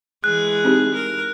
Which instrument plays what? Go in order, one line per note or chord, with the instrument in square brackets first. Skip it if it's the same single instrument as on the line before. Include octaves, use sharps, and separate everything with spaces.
[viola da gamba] E3 G#3 G#4 [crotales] F#6
[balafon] C4 D#4 G4
[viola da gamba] A#4